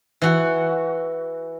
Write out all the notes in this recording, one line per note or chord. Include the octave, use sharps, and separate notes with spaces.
E3 F#4